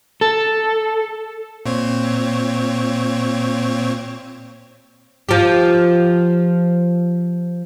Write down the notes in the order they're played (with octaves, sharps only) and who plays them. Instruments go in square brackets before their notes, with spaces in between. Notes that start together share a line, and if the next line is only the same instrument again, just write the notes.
[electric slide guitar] A4
[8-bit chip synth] A#2 C4 C#5
[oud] F3 G4